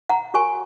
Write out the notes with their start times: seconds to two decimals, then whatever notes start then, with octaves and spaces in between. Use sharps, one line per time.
0.09 F#5 A#5
0.34 F#4 A#4 C#5 G#5 C#6